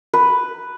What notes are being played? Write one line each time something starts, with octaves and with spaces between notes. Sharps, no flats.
B4